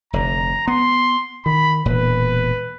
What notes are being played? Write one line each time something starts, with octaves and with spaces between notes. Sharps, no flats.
F1 D3 A#5
B3 C6
D#3 B5
E1 A#2 B4